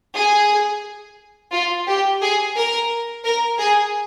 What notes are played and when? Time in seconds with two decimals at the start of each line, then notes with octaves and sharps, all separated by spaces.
0.15 G#4
1.53 F4
1.87 G4
2.21 G#4
2.56 A#4
3.24 A#4
3.59 G#4